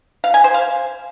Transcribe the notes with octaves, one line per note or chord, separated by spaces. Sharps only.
F5
G#5
C5
F5